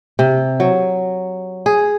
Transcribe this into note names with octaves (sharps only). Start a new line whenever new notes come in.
C3
F#3
G#4